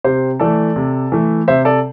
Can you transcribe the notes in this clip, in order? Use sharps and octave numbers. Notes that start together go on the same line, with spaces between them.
C3 G4 C5
E3 A3 A4 D5
C3
E3 A3
C3 C5 E5
A4 D5